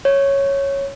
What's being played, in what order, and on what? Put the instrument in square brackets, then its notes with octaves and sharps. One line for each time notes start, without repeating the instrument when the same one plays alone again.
[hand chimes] C#5